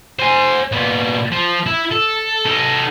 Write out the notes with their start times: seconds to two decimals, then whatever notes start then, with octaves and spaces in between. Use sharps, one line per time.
0.19 C5 G#5
0.72 A#2 B3
1.32 F3
1.66 E4
1.91 A4
2.46 D#4 A4